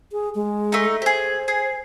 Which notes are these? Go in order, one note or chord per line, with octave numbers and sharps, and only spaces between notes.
G#4
G#3
A3 D#4
G4 G#4 C5
G#4